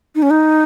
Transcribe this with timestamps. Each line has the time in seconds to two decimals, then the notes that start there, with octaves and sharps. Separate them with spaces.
0.15 D#4
0.22 C#4
0.30 D#4